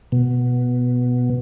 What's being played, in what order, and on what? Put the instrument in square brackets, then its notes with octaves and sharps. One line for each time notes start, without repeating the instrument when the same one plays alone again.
[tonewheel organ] B2